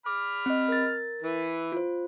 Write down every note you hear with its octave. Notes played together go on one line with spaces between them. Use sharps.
B5 D6 F6
C4 D#5
A#4 A6
E3 B4
F4 C5